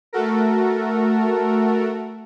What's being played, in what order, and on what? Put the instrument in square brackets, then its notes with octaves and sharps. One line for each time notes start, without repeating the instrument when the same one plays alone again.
[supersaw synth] A3 F#4 A4 A#4